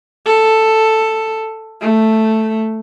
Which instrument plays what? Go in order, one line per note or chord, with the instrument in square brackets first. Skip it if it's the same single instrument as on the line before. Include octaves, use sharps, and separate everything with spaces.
[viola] A4
A3